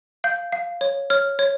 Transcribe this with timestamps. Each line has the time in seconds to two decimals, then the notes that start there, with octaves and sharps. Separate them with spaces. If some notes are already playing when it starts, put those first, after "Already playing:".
0.24 F5 G6
0.52 F5
0.81 C#5
1.10 C#5 F6
1.39 C#5